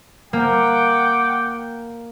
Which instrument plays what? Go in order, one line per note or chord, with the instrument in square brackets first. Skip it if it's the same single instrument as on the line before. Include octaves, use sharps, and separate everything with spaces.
[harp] A#3 [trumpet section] F#5 G5 D6